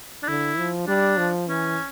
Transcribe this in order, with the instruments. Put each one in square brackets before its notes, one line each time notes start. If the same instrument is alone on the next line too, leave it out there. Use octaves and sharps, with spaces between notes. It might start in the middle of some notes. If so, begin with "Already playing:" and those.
[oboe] D4
[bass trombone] D3 [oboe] E4
[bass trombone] F3
[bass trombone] G3 [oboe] D4
[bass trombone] F3
[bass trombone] E3 [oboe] C#4